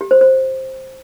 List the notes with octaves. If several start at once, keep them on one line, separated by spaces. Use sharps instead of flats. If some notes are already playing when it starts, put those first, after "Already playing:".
G4
C5
C5